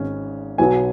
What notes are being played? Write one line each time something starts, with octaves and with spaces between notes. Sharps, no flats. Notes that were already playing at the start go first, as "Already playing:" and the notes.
Already playing: G#1 G#2 G#3 C#4
B1 B2 F#3 B3 G#5